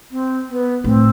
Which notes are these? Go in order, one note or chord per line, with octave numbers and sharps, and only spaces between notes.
C4
B3
A2 C4